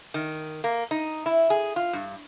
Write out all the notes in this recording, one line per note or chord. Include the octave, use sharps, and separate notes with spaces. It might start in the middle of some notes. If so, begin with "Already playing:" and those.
D#3
A#3
D#4
E4
G#4
F4
G2